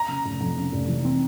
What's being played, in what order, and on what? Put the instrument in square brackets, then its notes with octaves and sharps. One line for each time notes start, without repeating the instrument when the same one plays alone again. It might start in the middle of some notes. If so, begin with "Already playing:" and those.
Already playing: [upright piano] A#5
[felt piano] C#3
F1
F2
C#3
F1
E3
C4